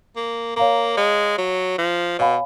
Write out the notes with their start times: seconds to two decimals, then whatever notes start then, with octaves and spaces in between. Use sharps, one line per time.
0.16 A#3
0.56 A#3 C#5 F5 A#5
0.97 G#3
1.38 F#3
1.78 F3
2.19 B2 C#5 F5 G#5 B5